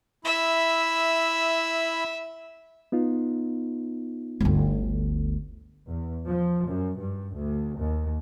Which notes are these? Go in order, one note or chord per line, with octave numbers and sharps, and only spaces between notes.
E4 E5 B5
B3 D#4 F4
G1 D2
E2
F3
F#2
G2
D2
D#2